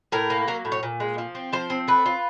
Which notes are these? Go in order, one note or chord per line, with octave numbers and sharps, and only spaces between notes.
A2 A#4
A#3
F#3 A#4
A2
C#5
A#2
G#3
F3
C4
F3 C5
C4
A3 B4
F4